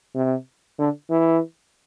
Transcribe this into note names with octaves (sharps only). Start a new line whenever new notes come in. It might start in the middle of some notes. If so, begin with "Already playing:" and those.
C3
D3
E3